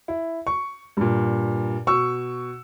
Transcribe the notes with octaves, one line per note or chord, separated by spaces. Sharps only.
E4
C#6
G2 A#2
B2 C#6 E6